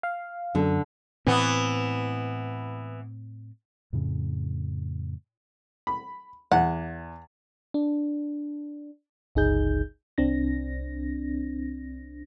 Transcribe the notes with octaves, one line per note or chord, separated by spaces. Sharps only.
F5
F#2 D3
A2 E3 B3 C4
F2 A2 C#3
B5
E2 F#5
D4
G1 C#2 D#4 G#4 G6
C2 C4 D4 A#6